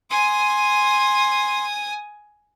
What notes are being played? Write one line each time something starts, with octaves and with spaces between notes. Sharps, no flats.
G#5 C6 D#6